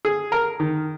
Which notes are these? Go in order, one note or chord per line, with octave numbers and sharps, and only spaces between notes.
G#4
A#4
D#3